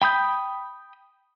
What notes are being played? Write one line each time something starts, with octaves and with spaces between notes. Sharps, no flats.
G5 B5 D#6 G6